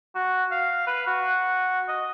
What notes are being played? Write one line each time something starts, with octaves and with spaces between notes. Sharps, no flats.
F#4
F5
B4
F#4
D#5